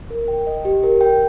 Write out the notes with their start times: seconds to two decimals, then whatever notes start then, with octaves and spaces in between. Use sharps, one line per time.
0.11 A#4
0.28 G5
0.47 D#5
0.65 G4
0.83 A#4
1.01 G5